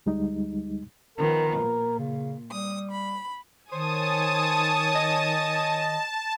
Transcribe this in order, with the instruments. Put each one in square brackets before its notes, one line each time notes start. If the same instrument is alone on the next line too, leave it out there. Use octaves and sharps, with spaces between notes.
[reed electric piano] D2 G3 G#3 D#4
[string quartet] D#3 F3 B3 [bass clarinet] A#4
[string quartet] A#2
[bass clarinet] C#3
[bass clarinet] G3 [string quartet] D#6
[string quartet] B5
[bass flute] D#3 [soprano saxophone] C5 [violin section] C#5 G#5 D#6 [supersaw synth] A5
[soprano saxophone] D#5